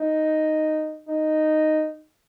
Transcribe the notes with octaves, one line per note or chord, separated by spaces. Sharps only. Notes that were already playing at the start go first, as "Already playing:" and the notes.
Already playing: D#4
D#4